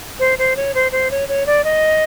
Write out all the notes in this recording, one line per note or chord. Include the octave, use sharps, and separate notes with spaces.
C5
C5
C#5
C5
C5
C#5
C#5
D5
D#5